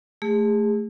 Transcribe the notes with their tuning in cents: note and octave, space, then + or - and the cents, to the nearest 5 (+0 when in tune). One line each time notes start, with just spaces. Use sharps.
A3 +0 G#4 -30